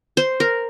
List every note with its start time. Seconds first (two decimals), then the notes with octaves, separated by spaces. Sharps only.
0.17 C5
0.40 A#4